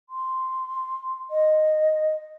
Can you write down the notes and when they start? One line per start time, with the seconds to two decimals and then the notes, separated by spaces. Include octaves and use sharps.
0.10 C6
1.31 D#5